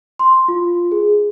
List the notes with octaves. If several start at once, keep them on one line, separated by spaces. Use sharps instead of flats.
C6
F4
G#4